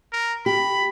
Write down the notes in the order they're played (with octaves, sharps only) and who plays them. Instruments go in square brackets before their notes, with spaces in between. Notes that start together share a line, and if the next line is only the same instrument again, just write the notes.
[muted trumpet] A#4
[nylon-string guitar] G4 [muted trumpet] B5